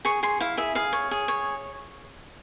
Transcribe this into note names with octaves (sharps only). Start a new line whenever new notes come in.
G#4 C#6
G#4 C6
E4 F5
G#4 E5
G#4 F5
C#5
G#4
C#5